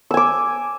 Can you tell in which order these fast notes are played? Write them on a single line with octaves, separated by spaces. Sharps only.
E6 G#5 D6